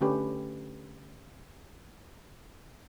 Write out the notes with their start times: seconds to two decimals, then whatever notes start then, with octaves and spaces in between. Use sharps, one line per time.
0.01 D3 A3 C#4 G4 B4